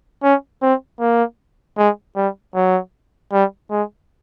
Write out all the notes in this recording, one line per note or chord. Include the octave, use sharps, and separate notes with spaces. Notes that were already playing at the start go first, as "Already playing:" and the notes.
C#4
C4
A#3
G#3
G3
F#3
G3
G#3